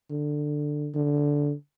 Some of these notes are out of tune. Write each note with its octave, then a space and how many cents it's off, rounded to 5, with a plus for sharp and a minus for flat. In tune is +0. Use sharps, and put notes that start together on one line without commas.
D3 +10
D3 -10